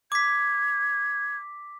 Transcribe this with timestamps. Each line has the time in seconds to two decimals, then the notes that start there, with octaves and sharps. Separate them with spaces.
0.12 D6 G#6 B6